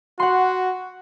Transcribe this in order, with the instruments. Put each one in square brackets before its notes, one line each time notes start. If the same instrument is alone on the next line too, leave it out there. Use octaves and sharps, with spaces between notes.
[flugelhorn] F#4 [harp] F#5 C6